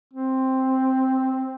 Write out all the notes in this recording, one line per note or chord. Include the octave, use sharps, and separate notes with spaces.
C4